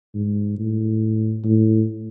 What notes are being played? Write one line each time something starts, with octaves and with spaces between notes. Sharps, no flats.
G#2
A2
A2